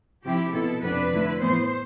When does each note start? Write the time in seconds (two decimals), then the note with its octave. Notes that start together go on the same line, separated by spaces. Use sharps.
0.24 C3 F3 C4 E4 G4
0.53 B2 B3 E4 A4
0.82 F2 C3 F3 B3 D4 B4
1.12 D3 A3 E4
1.40 A2 E3 B3 C5